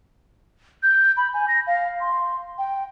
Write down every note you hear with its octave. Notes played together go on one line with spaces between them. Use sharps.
G6
B5
G#5
A#6
F5
C6
G5